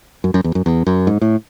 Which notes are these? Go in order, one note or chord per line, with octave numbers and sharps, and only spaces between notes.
F#2
F#2
E2
F#2
E2
F#2
G#2
A2